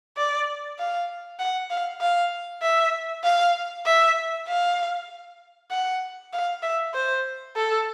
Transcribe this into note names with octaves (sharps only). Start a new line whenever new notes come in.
D5
F5
F#5
F5
F5
E5
F5
E5
F5
F#5
F5
E5
C5
A4